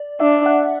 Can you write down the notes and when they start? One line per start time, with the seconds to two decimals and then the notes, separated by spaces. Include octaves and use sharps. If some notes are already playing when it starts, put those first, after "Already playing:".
Already playing: D5
0.20 D4 E5
0.46 F#5